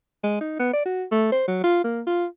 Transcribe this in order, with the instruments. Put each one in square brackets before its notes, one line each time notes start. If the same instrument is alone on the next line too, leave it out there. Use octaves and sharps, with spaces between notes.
[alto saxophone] G#3
D#4
B3
D5
F#4
A3
C5
F#3
F4
A#3
F4